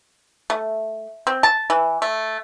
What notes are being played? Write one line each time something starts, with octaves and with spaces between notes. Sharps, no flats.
A3
C4
A5
E3
A3